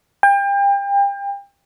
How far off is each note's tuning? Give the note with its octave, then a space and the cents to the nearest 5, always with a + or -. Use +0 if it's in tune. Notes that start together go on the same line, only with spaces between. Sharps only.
G5 +35